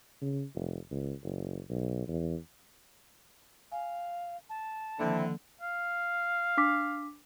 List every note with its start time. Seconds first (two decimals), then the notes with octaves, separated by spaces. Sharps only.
0.22 C#3
0.55 F1
0.91 C#2
1.24 F#1
1.70 B1
2.08 E2
3.72 F5 G#5
4.49 A5
4.99 D3 D#3 F3 A#3 C4 E4
5.61 F5
6.57 D4 D6 B6